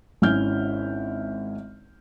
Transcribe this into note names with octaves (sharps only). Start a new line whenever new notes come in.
G#1 C#4 E4 E5 F6 G6